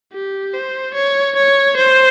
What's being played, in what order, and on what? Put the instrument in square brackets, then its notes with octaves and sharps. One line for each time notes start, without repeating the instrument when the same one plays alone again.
[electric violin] G4
C5
C#5
C#5
C5